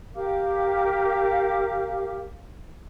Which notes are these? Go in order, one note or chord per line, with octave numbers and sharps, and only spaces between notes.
G4 A#4 F5 D6